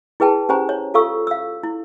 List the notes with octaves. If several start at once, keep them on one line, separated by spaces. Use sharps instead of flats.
E4 G#4 B4 G5 A5
C#4 G4 C5 G#5 A#5
C#5
F4 A4 F5 C#6 E6
F5 E6
E4